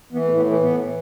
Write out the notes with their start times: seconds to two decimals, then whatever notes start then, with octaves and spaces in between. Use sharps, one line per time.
0.12 E3 B3
0.25 A3
0.29 A2
0.37 B3
0.45 E3 A3
0.61 A2 B3
0.77 E3